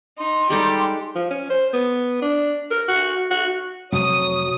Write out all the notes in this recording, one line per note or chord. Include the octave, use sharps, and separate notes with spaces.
D#4 C6
G3 G#3 D#4 G4 A4
F3
C#4
C5
B3
D4
A#4
F#4
F#4
F1 F#3 C#5 D#6